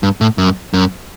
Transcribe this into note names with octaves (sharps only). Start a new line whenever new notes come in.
G2
A2
F#2
F#2